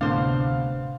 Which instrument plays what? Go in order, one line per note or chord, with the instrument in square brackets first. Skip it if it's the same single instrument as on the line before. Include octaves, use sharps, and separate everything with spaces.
[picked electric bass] D2 A2 [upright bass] C3 [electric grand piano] B3 F5 [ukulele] D4 C5